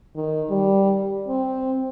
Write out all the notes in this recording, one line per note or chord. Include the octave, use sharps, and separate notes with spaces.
D#3
G3
C4